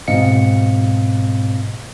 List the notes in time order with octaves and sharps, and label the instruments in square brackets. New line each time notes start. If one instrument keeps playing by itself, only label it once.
[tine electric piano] G#2 B2 C4 D#5 F5 C#7